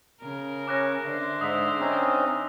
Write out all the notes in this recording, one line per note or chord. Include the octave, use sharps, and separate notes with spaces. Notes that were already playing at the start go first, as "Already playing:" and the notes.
C#3 A#4
C#4 D6 F#6 A#6
D3 C5 E5
G#2 G#3 D#6 E6 B6
C4 C#4 D#4